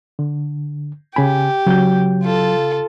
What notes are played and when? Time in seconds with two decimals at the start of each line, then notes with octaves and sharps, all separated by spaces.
0.19 D3
1.16 C#3 G4 G#5 B5
1.67 C#3 F#3 G6
2.23 F4 A4